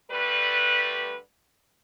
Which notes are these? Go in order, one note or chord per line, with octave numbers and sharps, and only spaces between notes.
D3 G3 A3 B4